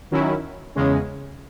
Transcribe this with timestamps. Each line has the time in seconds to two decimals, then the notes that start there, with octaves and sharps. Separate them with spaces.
0.11 D#3 F#3 C#4 E4
0.75 E2 C#3 G#3 C#4